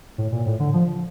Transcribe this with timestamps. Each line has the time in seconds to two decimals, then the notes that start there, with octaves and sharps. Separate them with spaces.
0.18 A2
0.32 A#2
0.46 A2
0.60 D3
0.74 F3